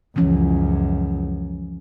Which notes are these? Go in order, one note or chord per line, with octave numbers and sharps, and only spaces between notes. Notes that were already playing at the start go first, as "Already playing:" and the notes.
C#2 F#2 E3 F3 C#4